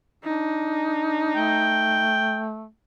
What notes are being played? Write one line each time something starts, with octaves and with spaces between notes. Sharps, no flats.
D4 D#4
A3 G5